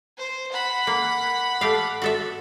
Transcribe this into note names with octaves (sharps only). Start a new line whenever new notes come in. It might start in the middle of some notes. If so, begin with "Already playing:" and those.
C5
F#5 B5
A#3
A3 G4 F5
F#4 A4 E5